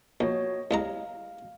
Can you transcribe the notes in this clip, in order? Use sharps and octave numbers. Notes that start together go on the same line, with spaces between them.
A#1 F#4 C#5 D#5
C2 G#3 F5 A#5